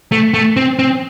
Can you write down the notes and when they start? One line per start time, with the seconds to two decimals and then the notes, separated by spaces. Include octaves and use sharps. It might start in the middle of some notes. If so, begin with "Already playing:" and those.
0.12 A3
0.34 A3
0.57 C4
0.79 C4